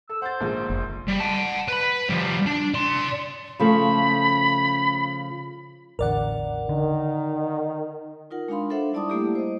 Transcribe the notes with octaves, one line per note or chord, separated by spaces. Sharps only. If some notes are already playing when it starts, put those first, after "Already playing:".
A4 E6
C5 F#5 A6
A#1 G#2 F3
F#1
G3
F#5 A5
B4 B5
F3 G3
D4
D5 C6
C#3 F3 A3 B5
A1 E2 D3 A#4 D5 F#5
D3 D#3
D#4 F4 A#4 F#5
G#3 D4 D#4 F5 B5 C6
D4 A4 C5 E5 F#5
G3 E4 D5 A5 D6 D#6
G3 A3 A#3 E4 G4
C5 D#5